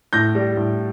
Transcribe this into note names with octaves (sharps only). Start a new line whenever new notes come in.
A2 G6 A#6
G3
A2